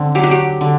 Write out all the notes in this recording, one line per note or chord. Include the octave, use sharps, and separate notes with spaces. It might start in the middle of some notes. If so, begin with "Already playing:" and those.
Already playing: D3 C4
F#3 G4
F#4
G4
D3